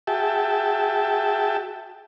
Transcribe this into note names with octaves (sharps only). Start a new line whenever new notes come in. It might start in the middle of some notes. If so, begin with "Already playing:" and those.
F#4 G#4 E5 G5 A5